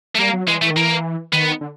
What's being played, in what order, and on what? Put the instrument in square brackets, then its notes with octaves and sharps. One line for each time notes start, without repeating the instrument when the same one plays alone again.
[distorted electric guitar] A3
[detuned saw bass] G3 [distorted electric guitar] A#3
[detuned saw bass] F#3
[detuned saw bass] E3 [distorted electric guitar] G#3
[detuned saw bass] E3 [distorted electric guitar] A3
[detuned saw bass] D#3
[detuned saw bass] E3 [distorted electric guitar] A#3
[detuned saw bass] D#3 [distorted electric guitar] B3
[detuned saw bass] D3